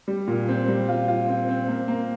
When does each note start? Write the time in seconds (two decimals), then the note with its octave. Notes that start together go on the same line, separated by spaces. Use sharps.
0.08 G3
0.28 A#2
0.48 C4
0.68 G3
0.88 F4
1.08 F4
1.28 C4
1.49 C4
1.68 A#3
1.88 A#3